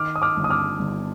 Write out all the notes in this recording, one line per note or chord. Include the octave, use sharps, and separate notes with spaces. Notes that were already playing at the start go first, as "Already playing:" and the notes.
Already playing: D#3 D6 F6
D#6
D6 F6
G1
D#6
D6 F6
G1